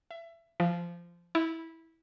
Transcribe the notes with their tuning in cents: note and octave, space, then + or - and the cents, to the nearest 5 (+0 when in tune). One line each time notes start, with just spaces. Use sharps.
E5 +25
F3 -15
E4 -15